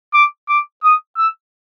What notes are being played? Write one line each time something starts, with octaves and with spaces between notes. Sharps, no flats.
D6
D6
D#6
E6